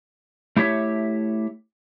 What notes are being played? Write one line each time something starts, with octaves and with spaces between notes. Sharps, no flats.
A3 E4 G4 C#5 E5